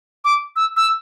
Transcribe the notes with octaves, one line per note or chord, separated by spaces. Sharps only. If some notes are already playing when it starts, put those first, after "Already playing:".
D6
E6
E6